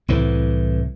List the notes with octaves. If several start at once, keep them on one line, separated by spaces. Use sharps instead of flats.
C2 A2 E3